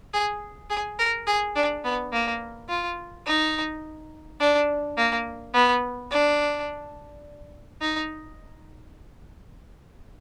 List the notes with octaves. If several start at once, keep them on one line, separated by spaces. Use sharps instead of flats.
G#4
G#4
A#4
G#4
D4
B3
A#3
F4
D#4
D4
A#3
B3
D4
D#4